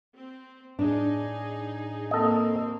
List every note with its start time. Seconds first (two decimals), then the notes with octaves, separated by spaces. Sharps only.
0.15 C4
0.79 A2 D4 D#4 G#4
2.11 A#3 C4 A4 D#5